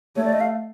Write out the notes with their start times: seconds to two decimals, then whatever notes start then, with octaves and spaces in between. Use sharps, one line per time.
0.16 A3 C#5
0.25 D5
0.33 D#5
0.40 F5